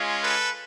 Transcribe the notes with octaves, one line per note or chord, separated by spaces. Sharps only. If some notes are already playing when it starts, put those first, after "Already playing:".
Already playing: G#3 C#4 F4
A4 B4